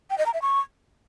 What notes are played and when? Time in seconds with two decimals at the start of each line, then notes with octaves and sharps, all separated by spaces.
0.10 G5
0.18 D#5
0.26 A#5
0.34 E5
0.42 C#6